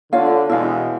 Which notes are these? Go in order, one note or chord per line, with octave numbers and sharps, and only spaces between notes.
D3 F4 C#5 F5
E2 B2 G#3 E4 F5